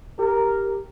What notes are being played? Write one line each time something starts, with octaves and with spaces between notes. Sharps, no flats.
G4 A#4